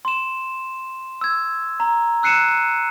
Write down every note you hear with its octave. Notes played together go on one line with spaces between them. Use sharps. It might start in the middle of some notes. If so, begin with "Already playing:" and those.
C6 E7
E6 G#6
A#5
E6 F#6 C7 C#7 D#7 E7